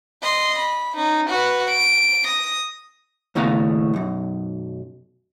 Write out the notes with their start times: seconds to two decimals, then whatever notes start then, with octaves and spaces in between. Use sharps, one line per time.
0.23 D#5 C6
0.58 B5
0.96 C#4 D#4
1.29 F#4 B4
1.70 D7
2.26 D#6 A#6
3.35 D#2 A2 C#3 B3 F5 A#5
3.94 B1 F#2